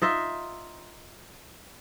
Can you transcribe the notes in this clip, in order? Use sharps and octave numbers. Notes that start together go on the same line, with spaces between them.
D#4 F4 E5